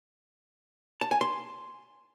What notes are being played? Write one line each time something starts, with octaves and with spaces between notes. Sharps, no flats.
A5
G#5
C6